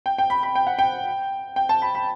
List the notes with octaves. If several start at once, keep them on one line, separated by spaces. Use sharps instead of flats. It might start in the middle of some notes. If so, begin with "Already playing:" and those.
G5
G5
B5
B5
G5
F#5
G5
G5
A5
B5
B5